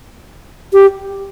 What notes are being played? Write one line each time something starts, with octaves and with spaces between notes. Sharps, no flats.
G4